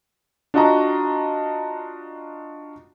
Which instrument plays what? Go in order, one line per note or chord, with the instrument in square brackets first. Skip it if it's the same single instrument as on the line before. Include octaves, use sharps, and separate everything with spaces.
[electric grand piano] D4 F4 F#4 D#5 A5 A#5